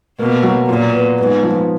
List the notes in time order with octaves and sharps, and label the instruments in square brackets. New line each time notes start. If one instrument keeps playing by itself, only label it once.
[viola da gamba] B2 [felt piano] A#3
[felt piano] F#3
[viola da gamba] A#2 [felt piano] F4
[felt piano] B3
[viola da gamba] G#2 [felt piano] B3
[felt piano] F3